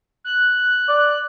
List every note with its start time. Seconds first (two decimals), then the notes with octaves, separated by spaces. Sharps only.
0.24 F#6
0.88 D5